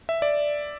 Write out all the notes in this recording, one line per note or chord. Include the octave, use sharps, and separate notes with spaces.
E5
D5